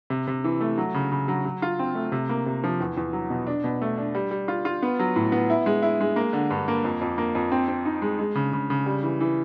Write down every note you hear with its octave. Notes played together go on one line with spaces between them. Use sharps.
C3
C3
E3
A3
F#3
C#3
C#3
F#3
F#3
F4
C4
A3
C3
A#3
C3
F3
E2
E2
F#3
B2
D4
B2
A3
D4
G3
G3
F4
F4
B3
F#3
A2
B3
E4
G#3
E4
G#3
A#3
D3
G2
A#3
F2
F2
A#3
F2
C4
C4
D#4
G#3
G#3
C#3
C#3
C#3
G3
E3
E3